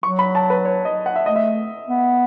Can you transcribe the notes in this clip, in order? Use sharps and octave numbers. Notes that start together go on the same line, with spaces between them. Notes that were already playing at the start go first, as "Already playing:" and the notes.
F#3 C#6
B5
A5
B4
C#5
D#5
F#5
E5
A3 D#5
E5
B3